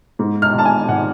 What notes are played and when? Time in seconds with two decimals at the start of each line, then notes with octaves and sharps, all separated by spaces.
0.19 G#2
0.42 F6
0.54 G#1 A5
0.65 G#5
0.88 G#1 F#5